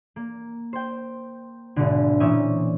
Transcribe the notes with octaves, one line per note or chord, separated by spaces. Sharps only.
A#3
C5 G5
G#1 B2 D3
A#2 E3 C4 C#4 E5 D#6